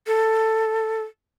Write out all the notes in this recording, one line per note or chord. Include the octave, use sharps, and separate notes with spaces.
A4